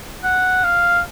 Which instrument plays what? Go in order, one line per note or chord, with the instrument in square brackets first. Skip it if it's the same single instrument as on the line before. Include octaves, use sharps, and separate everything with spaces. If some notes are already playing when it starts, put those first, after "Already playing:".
[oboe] F#5
F5